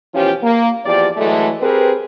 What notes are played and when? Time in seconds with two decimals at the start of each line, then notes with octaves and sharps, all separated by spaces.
0.14 B2 E3 F3 C#4 F4 G4
0.43 A#3
0.85 E2 F3 G4 D5
1.17 E3 F#3 G#3 A3
1.61 C4 G4 G#4 A#4 B4